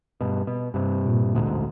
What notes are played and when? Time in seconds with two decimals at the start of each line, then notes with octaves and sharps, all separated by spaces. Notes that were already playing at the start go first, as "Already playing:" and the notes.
0.21 G2 B2
0.47 B2
0.74 G2 C3
1.06 A#2
1.35 A1 D2 G#2